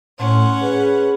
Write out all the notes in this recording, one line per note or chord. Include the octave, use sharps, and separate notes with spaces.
A2 C#4 F#5 C6
G#4 B4